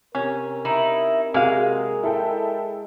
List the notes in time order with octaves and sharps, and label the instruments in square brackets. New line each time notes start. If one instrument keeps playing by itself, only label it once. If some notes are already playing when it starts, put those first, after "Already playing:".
[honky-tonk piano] C3 [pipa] C#4 [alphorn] A#4
[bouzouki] D#4 E4
[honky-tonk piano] C3 F#4 G#4 [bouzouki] G#3 [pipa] A#3 F5
[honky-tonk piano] E4 A4 G5